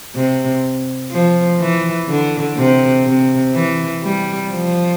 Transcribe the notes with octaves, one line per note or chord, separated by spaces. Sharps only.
C3
F3
E3
D3
C3
C3
E3
G3
F3